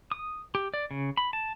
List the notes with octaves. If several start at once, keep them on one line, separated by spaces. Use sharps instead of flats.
D#6
G4
D5
C#3
B5
A5